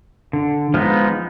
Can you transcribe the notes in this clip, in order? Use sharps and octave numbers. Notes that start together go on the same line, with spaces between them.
D3
F3 G#3 B3 D#4